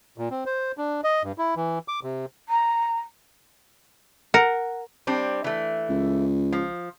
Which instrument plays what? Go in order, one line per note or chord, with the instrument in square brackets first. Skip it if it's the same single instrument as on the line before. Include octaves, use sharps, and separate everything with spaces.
[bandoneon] A#2
C4
C5
D4
D#5
G2
E4
E3
D6
C3
[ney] A#5
[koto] A#4 [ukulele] F#5
[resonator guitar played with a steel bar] G3 C4 D4
E3 A3
[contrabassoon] C#2
[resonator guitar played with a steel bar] F3